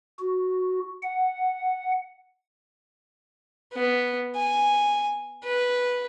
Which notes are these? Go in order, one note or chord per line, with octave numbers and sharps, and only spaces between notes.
F#4
F#5
B3
G#5
B4